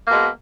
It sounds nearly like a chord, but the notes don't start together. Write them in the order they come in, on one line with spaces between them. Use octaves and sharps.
A#3 B2 G#3